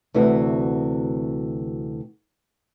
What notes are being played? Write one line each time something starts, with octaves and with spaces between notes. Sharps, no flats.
D2 C3 E3 F#4